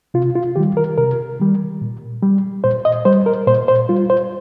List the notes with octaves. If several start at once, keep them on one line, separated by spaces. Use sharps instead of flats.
C3 F4
F4
D#3 G3 G4
A#4
C3 A#4
D#3 G3
A#2
G3
A#2 C5
D#5
G3 C5
A#4
A#2 C5
C5
G3 F4
C5